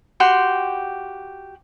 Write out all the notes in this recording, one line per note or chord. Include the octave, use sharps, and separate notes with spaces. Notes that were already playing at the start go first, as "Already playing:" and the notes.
F#4 G4 G5 C6